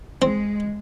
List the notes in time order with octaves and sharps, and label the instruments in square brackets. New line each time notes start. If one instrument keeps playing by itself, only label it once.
[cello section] G#3 [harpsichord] C4